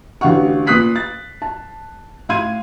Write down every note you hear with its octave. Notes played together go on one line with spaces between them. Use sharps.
A1 D3 F#4 F5 F#5 C#6
A#2 B4 D#6 F#6 B6 C7
A6
A5
A2 F5 C6 G#6 D#7